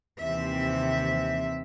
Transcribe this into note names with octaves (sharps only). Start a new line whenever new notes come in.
D#2 C3 E3 C4 E5